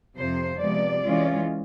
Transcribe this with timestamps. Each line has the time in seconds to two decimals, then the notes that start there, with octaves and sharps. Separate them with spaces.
0.16 F2 C3 F3 C5
0.59 C3 F3 G#3 B3 D5
1.03 E3 G#3 C#4 F4